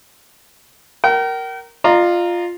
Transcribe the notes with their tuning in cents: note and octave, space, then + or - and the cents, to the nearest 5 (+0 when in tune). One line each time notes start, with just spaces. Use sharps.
A#4 +0 G5 -40
F4 +0 D#5 -45 A#5 +0